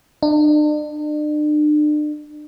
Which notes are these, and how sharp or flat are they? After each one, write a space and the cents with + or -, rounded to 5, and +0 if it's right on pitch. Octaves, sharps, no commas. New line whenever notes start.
D4 +40